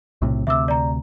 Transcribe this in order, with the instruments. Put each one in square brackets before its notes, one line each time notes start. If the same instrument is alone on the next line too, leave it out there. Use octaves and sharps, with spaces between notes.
[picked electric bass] B1 A2 C3
[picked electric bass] D2 C3 [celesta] E5 D6 E6
[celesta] D5 A#5